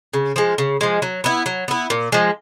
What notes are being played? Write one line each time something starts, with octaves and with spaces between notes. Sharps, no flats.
C#3
F3 G#3
C#3
F3 G#3
F#3
B3 E4
F#3
B3 E4
A#2
F3 G#3